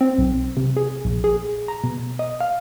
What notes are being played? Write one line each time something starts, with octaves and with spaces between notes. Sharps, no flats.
C4
B1
C3
G#4
A#1
G#4
A#5
B2
D#5
F5